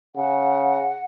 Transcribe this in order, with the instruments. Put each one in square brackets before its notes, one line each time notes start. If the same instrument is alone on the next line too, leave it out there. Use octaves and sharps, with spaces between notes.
[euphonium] C#3 [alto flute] F#5